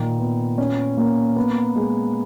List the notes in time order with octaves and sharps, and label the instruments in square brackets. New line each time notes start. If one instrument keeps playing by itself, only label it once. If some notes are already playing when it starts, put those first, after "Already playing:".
Already playing: [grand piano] A#2 D#3
B3
C#4
A#3
B3
G#3